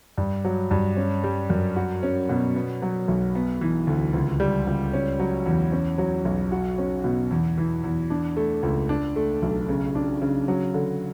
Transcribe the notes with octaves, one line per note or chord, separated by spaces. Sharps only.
G2
F#3
G2
C#4
G3
F#2
F#4
C#4
B2
B3
F#3
B1
B3
E3
D2
C#2
G3
C#2
C#4
F#3
E2
C#4
F#3
B1
F#4
C#4
B2
E2
E3
E2
D4
A3
C#2
D4
A3
B1
C#3
D4
C#3
F#3
D3